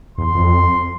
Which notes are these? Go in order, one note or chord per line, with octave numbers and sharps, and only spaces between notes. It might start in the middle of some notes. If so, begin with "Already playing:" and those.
E2 C6
F2